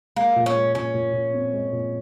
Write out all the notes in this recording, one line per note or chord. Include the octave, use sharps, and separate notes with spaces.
G#3 A#3
A#2
C#4
G#3
A#2 C#4
A#2
A#2
C4
G#3
A#2